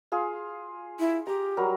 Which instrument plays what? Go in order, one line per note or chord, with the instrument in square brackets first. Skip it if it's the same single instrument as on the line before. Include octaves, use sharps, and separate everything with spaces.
[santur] F4 G#4 F5
[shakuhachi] E4
[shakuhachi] G4 [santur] A#5
[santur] F#3 G3 A#4